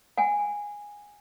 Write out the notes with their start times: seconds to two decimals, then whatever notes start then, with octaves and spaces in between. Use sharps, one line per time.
0.17 F#5 G#5